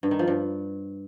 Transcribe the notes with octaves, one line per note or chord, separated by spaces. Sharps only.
G2
D#3
F3
G2